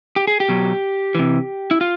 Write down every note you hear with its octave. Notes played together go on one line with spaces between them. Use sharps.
G4
G#4
G4
B2 F#3
C3 E3
E4
F4